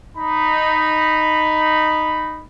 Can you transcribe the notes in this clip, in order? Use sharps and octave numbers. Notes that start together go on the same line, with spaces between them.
D#4 B5